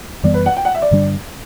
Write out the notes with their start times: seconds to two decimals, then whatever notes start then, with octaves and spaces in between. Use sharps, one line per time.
0.23 F#2 E3 G3 B3 D5
0.34 B4
0.46 F#5
0.57 G5
0.65 F#5
0.75 E5
0.82 D5
0.91 G2 D3 G3 D4